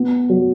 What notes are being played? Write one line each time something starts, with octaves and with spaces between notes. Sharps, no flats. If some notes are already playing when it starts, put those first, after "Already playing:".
Already playing: B3
F#3